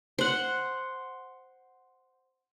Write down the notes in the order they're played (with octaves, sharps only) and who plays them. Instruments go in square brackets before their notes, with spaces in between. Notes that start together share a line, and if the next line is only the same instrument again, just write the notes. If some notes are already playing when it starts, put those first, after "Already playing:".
[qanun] C5 F#5